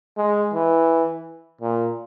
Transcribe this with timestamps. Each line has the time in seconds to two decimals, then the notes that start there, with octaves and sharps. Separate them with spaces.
0.17 G#3
0.54 E3
1.61 A#2